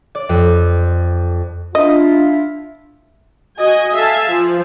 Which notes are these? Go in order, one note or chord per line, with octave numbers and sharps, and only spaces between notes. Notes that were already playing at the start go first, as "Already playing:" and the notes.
D5
F2
D4 E4 F4 D#5
F#4 D#5 G#5
A4 E5 F5 G#5 A5
F3